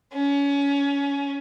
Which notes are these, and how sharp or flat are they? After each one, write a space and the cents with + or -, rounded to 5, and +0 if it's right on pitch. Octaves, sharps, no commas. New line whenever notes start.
C#4 +25